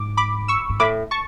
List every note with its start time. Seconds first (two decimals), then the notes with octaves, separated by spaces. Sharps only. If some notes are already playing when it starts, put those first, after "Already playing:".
Already playing: G#2 D6
0.17 B5 D6
0.48 C#6 E6
0.69 G#2
0.79 A2 B5 D6
1.11 A5 C#6